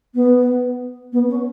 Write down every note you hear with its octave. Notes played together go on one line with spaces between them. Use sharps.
B3
B3
C#4